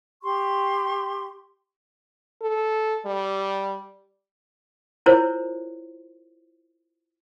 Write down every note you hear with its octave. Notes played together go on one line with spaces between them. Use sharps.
G4 C6 C#6
A4
G3
E4 F4 A#4 C5 C#5